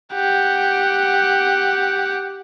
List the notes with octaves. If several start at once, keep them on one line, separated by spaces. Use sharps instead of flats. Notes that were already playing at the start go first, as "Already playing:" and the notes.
G4 F#5